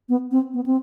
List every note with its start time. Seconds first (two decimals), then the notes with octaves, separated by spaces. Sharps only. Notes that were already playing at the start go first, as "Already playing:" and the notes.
0.09 B3
0.31 C4
0.54 B3
0.66 C4